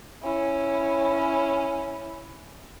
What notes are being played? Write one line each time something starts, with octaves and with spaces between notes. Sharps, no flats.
C#4 E4